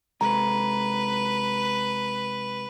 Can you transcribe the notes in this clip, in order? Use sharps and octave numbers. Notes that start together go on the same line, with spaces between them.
C3 G#3 A4 B4 A#5